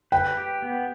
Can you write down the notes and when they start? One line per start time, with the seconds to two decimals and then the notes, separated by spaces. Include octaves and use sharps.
0.12 B4 G5
0.37 G4
0.62 B3